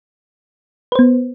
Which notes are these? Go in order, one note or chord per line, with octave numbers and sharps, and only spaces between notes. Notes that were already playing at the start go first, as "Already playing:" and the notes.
B3 B4 C5